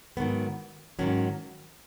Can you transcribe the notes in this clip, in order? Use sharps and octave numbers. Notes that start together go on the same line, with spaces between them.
G#2 D#3 F#3 B3
G#2 D#3 F#3 C#4